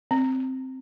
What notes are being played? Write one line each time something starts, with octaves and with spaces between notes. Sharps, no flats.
C4